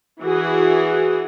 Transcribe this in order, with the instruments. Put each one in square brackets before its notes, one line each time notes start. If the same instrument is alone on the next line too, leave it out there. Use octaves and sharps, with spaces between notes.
[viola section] E3 F#4 G#4